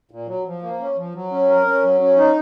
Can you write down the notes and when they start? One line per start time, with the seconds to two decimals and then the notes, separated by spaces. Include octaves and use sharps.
0.11 A#2
0.27 F#3
0.46 F3
0.62 A#3
0.80 C#4
0.96 F3
1.14 F#3
1.31 C#4
1.49 A#4
1.66 C#4
1.83 F#3
2.01 C#4
2.17 D#4